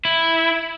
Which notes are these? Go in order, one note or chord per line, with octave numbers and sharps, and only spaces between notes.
E4